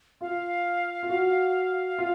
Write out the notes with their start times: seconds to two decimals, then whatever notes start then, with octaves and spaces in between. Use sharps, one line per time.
0.21 F4 F5
1.03 F4
1.09 F#4
1.98 F4